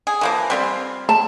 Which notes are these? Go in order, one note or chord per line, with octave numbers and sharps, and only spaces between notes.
G#4
E3 F3 A#3
G3 C4 F4
A5